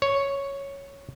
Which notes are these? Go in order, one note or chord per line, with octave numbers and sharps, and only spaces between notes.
C#5